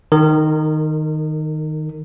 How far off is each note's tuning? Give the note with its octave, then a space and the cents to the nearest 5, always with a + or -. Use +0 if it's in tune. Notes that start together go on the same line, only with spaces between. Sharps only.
D#3 -5 A#4 -30